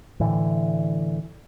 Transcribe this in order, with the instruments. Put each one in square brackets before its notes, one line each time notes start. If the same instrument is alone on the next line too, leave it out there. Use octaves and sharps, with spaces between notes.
[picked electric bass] A2 D3 E3